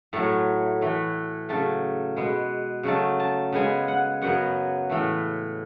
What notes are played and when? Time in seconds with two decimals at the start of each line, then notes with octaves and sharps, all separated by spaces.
0.13 A2 F#3 A3 A5
0.81 A2 E3 A3
1.49 C#3 F#3 A3 A5
2.16 B2 G#3 B3
2.83 C#3 F#3 A3 A5
3.20 A5
3.52 C#3 G#3 B3 G#5
3.88 F#5
4.22 F#2 C#3 F#3 B3 F#5
4.90 A2 E3 A3